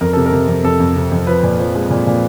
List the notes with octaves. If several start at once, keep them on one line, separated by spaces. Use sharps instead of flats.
F2 A#4
C3 A4
A#4
C3
F2
F2 A4
F2
C3
F2
F3 B4
A#2
F3
G#3
A#2
A#2